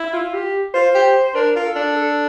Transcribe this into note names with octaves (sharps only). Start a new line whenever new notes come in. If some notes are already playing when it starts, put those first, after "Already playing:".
Already playing: E4
F4
G4
F4 C5
G4
D4 A#4
F4 A#4
A4
D4
A4